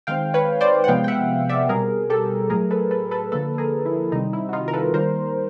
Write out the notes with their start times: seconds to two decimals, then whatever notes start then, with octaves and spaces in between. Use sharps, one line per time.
0.07 D#3 G#3 C4 F5 G5
0.34 B4 C#5
0.61 C5 D5
0.84 F#5
0.88 C3 F3 G#3 B3 F5 G5
1.04 G5
1.08 E5 F#5
1.49 D5 E5
1.69 B2 G3 C4 G#4 A#4
2.10 G4 A4
2.50 A2 F#3 A3 G#4 A#4
2.71 A4 B4
2.91 A4 B4
3.11 A4 B4
3.32 D3 F3 A#3 A4 B4
3.58 G#4 A#4
3.86 E4
4.12 C3 D#3 G3 C4 D#4
4.33 E4
4.49 F#4
4.53 D#4 F4
4.68 A#4
4.73 A4 B4
4.93 D#3 G3 A#3 A#4 C5